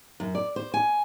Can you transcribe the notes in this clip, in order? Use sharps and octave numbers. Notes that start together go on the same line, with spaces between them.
F#2
D5
C5
G#5